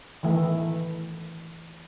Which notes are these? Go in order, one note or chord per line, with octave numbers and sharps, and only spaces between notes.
D#3 E3 A3